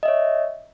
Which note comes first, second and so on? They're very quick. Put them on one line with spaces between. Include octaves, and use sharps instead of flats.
D#5 E5 C#5